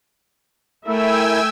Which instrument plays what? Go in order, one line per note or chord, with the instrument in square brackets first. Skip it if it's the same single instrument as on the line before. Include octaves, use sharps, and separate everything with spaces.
[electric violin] A3 [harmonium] E4 A#4 [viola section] E5 [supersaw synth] G5 G#5 E6